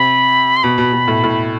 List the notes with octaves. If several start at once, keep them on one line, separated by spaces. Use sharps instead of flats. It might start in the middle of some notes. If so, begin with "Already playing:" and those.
Already playing: C3 B5
C6
B2 B5
B2
B2
A2
A2